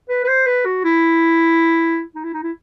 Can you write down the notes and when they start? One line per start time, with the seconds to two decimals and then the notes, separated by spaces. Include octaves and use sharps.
0.09 B4
0.24 B4
0.28 C5
0.46 B4
0.65 F#4
0.84 E4
2.15 D#4
2.24 E4
2.34 D#4
2.43 E4